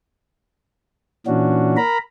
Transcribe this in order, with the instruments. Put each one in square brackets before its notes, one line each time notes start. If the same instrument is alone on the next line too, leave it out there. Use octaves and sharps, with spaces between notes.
[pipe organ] A#2 E3 C#4 D4 F#4
A#4 A#5 B5